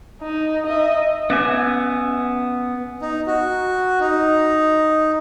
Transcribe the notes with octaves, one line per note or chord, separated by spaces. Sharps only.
D#4
D#5 E5
B3 C#4 E5 G#5
D#4
F#4
D#4